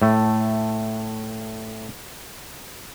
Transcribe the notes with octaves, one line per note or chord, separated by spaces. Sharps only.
A2 A3